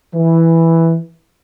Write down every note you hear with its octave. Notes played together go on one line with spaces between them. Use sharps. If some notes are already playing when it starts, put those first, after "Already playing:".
E3